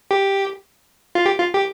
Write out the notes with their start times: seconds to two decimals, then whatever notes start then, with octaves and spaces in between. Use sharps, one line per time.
0.11 G4
1.15 F4
1.26 G4
1.39 F4
1.53 G4